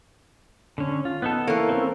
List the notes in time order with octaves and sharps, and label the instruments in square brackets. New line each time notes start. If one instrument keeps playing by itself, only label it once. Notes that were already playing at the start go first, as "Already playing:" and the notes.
[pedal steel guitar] D3 C#4
F4
B3 D#4 A4
[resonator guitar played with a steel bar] E3 A#3 [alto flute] A4 [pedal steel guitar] C#5
[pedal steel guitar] C4 C#4